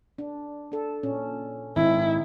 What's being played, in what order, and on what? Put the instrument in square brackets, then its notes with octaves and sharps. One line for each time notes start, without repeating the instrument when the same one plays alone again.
[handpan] D4
D4 A4
A#2 C#4
[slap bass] G#1 [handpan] C4 D#4 [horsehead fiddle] E4